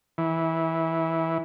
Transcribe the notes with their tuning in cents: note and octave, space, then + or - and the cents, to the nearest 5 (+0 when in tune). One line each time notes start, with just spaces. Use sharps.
E3 -15